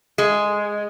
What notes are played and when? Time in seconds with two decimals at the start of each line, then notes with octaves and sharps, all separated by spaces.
0.18 G#3